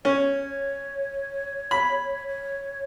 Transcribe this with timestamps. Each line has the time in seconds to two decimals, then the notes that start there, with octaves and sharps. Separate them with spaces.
0.05 C#4 C#5
1.71 B5
2.27 C#5